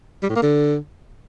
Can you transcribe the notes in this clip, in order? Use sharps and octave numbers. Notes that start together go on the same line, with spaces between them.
G3
A2
A#3
D3